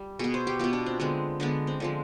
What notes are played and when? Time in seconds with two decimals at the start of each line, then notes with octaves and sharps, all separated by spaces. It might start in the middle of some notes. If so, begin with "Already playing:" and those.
Already playing: G3
0.19 B2 B3 G#4
0.34 C5
0.47 G4
0.59 B2 B3 F4
0.73 D4
0.86 C4
1.00 D3 G#3 B3 C4
1.40 D3 G#3 B3 D4
1.67 C4
1.80 D3 F3 G#3